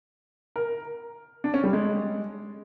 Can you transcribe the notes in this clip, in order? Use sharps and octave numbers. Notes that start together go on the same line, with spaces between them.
A#4
D4
C#4
G3
G#3